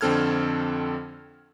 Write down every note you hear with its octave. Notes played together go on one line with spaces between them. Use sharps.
F2 D3 C4 A4 F6 G#6